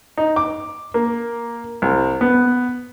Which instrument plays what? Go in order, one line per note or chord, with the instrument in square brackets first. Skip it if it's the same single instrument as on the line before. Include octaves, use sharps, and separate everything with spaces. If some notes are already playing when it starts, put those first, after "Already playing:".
[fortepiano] D#4
D6
A#3
C2
B3